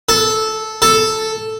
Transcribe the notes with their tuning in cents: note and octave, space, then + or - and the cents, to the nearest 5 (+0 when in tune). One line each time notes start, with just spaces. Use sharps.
A4 -10
A4 +0